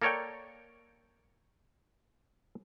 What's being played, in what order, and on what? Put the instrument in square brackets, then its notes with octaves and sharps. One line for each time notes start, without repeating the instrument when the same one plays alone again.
[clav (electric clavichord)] A#3 A4 A#4 C#5 D5 G5